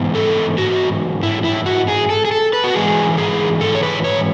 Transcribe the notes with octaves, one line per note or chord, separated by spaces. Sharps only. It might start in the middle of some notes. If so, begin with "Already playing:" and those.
Already playing: G#2 E3 B3
A4
F#4
E4
E4
F#4
G#4
A4
G#4
A4
B4
F#4
G#2 E3 G#3 G#4
G#4
A4
C#5
B4
C#5